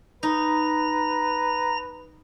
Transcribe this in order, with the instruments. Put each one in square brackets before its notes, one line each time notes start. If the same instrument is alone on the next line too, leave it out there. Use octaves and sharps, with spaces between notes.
[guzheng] D#4 [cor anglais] B4 [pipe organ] A#5 A#6